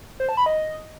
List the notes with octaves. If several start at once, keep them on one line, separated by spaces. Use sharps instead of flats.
C5
A5
B5
D#5